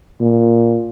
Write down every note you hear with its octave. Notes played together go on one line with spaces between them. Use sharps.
A#2